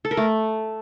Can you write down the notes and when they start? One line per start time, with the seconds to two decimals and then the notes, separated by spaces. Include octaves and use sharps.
0.05 A4
0.11 A#4
0.17 A3